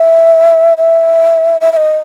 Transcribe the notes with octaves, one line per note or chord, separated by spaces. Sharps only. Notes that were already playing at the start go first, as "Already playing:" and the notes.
Already playing: E5
E5
E5
E5
D#5